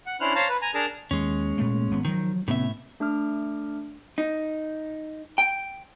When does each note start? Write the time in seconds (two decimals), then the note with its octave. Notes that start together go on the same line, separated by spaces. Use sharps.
0.06 F#5
0.20 C#4 D4 E4 C5 F6 F#6
0.35 C5 C#5 F5 A5 A#5
0.49 B4
0.62 G#5 A#5
0.74 D4 G#4 A#4 A5 A#5
1.11 D#2 G#3 C#4
1.58 A#2 A3 A#3
1.91 G#1 B3
2.05 D#3 F3 F#3
2.48 A2 C3 B3 C#4 E5
3.00 A3 D4 D6 F6
4.18 D#4
5.38 G5